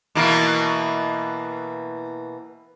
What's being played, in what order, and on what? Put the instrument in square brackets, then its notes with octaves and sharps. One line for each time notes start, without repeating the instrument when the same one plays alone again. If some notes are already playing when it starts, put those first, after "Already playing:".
[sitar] B2 E3 A#3